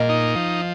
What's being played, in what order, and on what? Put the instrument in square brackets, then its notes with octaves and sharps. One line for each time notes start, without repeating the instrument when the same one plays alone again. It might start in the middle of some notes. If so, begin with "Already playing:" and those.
Already playing: [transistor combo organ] A#2 [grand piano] D#5
[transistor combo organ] D#4
F3